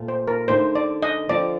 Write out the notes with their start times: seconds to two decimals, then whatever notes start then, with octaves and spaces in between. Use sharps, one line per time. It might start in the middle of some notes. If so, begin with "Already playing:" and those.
Already playing: A#2 A3 C4 F4
0.08 C5
0.28 A#4
0.48 D3 A3 D#4 C5
0.75 D5
1.03 D#5
1.29 D3 F3 C4 F4 D5